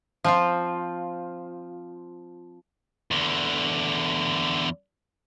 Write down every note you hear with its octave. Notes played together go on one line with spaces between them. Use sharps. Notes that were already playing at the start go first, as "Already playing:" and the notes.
F3 C4 F4
E2 D3